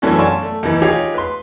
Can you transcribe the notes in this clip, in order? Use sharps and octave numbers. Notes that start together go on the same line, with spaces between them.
F#2 E3 A3 C#4 D4 F#4
D5 F5 G#5 A5 C6 C#6
A3
D#2 E3
D#4 F4 G4 G#4 C#5
B4 C6